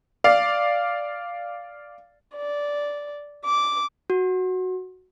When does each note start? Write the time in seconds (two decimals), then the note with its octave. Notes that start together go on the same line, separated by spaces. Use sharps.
0.24 D5 F5
2.37 D5
3.46 D6
4.10 F#4